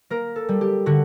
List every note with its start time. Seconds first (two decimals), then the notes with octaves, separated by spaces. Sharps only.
0.10 A#3 A#4
0.36 A4
0.49 G3
0.61 G4
0.86 D3 F#4